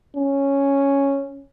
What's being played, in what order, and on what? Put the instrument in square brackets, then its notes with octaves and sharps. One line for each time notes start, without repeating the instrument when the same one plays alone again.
[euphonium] C#4